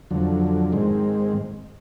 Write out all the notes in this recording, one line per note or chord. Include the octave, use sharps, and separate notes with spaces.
F2 D3 F#3
G#2 D#3 G#3 C4